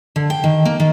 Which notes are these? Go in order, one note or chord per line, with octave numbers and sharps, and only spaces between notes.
D3
G5
D#3
A#3
D#3